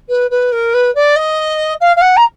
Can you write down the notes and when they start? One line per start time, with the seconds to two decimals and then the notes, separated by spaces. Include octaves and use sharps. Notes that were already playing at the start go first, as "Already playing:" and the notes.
0.09 B4
0.30 B4
0.52 A#4
0.74 B4
0.95 D5
1.16 D#5
1.81 F5
1.96 F5
2.01 F#5
2.16 A#5